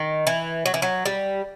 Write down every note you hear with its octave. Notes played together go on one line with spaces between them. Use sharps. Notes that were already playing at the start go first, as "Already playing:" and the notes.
Already playing: D#3
E3
F#3
E3
F#3
G3